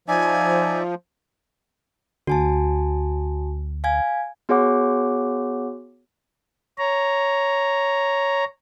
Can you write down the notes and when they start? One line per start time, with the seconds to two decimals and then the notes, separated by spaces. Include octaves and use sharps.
0.08 F3 D#4 D5 E5 G#5
2.27 D2 F#4 G#5 A5
3.84 F5 G#5 G#6
4.49 B3 F#4 G#4 C#5 F#5 D6
6.78 C#5 A#5